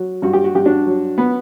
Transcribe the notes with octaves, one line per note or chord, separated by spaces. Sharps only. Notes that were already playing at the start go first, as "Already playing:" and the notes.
Already playing: F#3
G2 F#4
G4
F#4
G2 G4
D4 F#4
F#3
B3